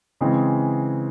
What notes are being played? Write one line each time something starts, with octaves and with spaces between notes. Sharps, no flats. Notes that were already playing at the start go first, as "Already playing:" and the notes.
C#3 E3 G#3 C4